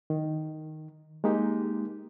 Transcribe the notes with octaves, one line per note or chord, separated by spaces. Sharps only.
D#3
G#3 A#3 D#4 G4